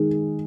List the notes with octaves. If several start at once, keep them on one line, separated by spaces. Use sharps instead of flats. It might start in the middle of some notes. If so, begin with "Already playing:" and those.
Already playing: D#3 G#3